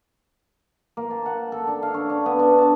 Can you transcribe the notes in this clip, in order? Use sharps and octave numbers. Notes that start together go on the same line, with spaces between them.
A#3
A5
F#5
A4
D4
F5
C#5
D4
B3
D4
A5